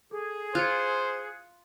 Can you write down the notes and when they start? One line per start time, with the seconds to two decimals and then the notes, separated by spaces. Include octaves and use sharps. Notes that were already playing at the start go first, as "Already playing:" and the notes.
0.11 G#4 A4
0.55 F4 C5 F#6 C#7